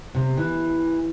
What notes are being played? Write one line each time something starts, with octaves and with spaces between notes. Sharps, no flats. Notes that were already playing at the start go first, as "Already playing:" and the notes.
C3
E3